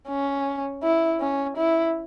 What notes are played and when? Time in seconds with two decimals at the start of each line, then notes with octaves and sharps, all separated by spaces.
0.08 C#4
0.83 E4
1.21 C#4
1.57 E4